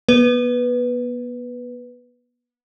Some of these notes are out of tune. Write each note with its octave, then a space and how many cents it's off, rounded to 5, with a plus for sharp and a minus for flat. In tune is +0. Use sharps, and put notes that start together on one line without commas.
B3 -30 B4 +0